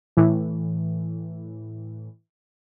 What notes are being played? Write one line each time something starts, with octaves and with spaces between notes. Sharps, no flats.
A2 E3